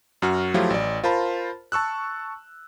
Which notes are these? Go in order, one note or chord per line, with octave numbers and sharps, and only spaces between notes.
F#2 F#4 F6
F3 F#3 A3 E4 F4 G4
A1 D5
F4 A#4 C5 A5 B5
A5 C#6 E6 F#6